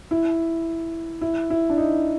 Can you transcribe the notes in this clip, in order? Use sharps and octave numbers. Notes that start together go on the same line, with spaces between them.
E4
E4
E4
D4
D#4